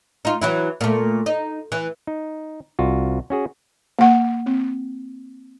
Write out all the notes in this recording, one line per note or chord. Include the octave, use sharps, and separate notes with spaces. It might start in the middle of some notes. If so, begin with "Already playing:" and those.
D#4 F4
E3 F#3 E4
A#2 A3
D#4
E3
D#4
C2 F4 F#4
C#4 F#4 G#4
A#3 F#5
C4